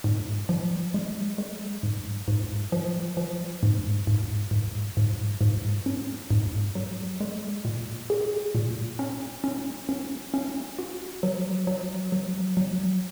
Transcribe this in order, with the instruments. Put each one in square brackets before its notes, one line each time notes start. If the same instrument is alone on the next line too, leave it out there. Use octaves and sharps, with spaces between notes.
[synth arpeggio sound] G#2
F3
G#3
G#3
G#2
G#2
F3
F3
G#2
G#2
G#2
G#2
G#2
C#4
G#2
F#3
G#3
A#2
G#4
A#2
C#4
C#4
C#4
C#4
F#4
F#3
F#3
F#3
F#3